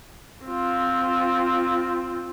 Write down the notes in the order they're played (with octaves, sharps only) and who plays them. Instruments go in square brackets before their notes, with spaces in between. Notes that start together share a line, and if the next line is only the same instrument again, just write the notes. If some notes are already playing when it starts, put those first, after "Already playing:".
[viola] C4 F4